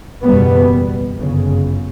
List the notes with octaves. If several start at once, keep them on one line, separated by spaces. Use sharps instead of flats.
F#1 E2 B2 G3 B3
G1 F#2 C#3